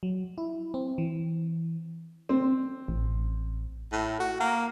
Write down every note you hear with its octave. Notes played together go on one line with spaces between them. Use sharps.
F#3
E4
C4
E3
C4
A1
A2
F#4
A#3